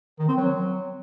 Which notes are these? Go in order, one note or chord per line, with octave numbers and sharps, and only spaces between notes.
D#3
C4
F#3